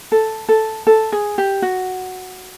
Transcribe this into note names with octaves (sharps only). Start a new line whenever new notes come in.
A4
A4
A4
G#4
G4
F#4